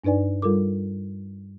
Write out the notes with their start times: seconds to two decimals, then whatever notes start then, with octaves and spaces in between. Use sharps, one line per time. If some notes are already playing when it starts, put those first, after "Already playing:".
0.04 G2 D4 D#4 B4 D5 G#5
0.42 G3 F4 A4 A#4 D6